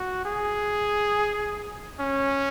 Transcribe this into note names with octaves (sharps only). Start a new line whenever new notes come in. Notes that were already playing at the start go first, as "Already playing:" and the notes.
Already playing: F#4
G#4
C#4